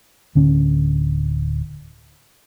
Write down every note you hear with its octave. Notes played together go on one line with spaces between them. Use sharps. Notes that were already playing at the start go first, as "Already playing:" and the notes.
D1 D3 C#4